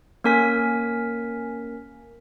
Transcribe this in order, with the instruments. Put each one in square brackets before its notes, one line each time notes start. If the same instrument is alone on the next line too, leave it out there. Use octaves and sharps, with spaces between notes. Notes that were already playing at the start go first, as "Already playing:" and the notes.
[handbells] A#3 C#4 A#4 G#5 B6